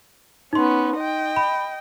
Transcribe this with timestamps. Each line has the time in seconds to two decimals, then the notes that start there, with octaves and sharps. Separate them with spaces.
0.53 B3 C#4 D#4 C6
0.97 D#5 G5
1.36 B5